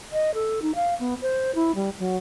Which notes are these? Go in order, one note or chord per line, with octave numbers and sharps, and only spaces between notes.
D#5
A4
D#4
F5
B3
C5
E4
G3
F#3